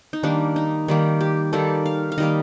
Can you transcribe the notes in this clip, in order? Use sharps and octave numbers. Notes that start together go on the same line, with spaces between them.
D#4
D#3 G3 A#3 D4
D#4
D#3 G3 A#3
G4
D#3 G3 A#3 A4
F5
F5
D#3 G3 A#3 D#5